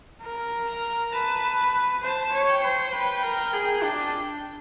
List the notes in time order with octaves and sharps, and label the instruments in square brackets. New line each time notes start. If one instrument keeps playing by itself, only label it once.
[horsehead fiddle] A#4
[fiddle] A#5
[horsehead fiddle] B4 [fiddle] A5
[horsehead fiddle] C5 [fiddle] A5
[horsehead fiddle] C#5
[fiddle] G5
[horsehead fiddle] C5
B4
A#4
G#4
[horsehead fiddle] D4 [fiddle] G5